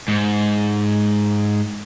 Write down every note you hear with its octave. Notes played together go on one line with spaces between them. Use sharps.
G#2